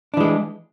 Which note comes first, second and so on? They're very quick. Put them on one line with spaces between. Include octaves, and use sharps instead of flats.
D4 E3 G#3